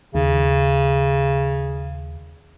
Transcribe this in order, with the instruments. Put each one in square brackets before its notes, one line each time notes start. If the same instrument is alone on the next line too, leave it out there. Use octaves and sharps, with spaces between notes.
[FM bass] D#2 [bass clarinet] C#3